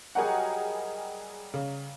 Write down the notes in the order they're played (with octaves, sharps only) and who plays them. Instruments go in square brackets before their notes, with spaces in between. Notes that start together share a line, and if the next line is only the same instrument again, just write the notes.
[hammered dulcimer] F#3 G3 D#4 [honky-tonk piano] G#4 A#4 F#5
[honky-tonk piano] C#3